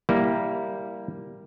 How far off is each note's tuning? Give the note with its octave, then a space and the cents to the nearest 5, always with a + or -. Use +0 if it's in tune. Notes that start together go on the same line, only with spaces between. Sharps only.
G3 +0 A#3 +0 E4 -15